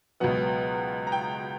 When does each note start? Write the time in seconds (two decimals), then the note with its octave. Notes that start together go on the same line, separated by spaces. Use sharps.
0.20 C#2 B2 F#3 B3 F#5
1.07 A#5
1.12 G5